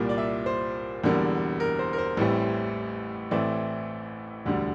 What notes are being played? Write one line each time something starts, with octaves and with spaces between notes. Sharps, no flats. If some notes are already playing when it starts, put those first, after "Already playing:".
Already playing: C2 A#2 G3 A#3
D5
E5
C5
E1 E2 D3 G3 A#3
A#4
C5
A#4
C5
A1 A2 E3 G3 C4
A1 A2 E3 A3 C4 D5
E1 D2 D3 G3